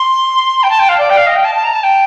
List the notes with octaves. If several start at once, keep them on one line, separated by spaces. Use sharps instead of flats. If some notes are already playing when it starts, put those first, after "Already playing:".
Already playing: C6
G5
A5
G5
F5
D5
G5
F5
D#5
G5
A5
A5
A#5
A5
G5